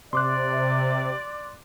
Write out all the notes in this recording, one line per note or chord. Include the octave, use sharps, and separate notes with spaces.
C3 D5 C6 D6 F#6